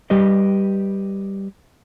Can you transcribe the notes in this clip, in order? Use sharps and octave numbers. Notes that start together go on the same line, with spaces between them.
G3 G4 B4 D#5